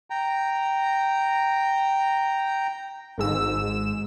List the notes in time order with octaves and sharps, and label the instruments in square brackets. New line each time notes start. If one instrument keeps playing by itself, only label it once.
[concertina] G5 A#5
[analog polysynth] G#1 G#2 E6